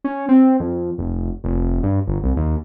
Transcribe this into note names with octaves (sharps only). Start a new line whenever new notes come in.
C#4
C4
F2
F1
F1
G2
G1
C2
D#2